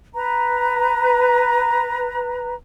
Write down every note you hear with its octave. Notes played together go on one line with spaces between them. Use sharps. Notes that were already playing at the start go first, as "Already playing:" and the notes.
B4 A#5